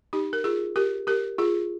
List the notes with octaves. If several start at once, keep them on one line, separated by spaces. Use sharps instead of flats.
D#4 G4
A#4
F4 G#4
G4 A#4
G4 A#4
F4 G#4